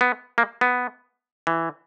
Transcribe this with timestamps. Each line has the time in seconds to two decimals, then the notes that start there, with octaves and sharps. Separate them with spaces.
0.01 B3
0.38 A#3
0.61 B3
1.47 E3